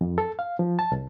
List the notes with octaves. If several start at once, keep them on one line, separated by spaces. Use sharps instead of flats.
F2
A4
F5
F3
A5
C2